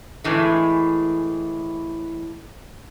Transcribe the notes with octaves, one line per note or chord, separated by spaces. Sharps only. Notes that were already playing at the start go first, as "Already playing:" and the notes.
A2 E3 G#3